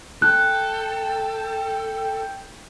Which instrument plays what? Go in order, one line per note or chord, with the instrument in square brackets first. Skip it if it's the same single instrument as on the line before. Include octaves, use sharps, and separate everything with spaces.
[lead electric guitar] A4 [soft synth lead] G5 [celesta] F#6